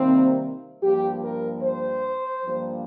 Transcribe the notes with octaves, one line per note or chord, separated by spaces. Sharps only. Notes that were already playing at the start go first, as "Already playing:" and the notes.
Already playing: C3 D#3 G3 A#3 C4
G2 F3 A#3 G4
A#4
C5
G2 F3 A#3